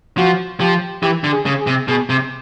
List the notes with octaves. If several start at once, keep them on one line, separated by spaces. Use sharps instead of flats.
F3 F#4
F3 G4
E3 G4
D3
G#4
C#3
G#4
C3
B2 G#4
C3